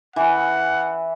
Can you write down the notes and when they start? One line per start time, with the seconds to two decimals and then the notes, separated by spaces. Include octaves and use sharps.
0.16 E3 F#5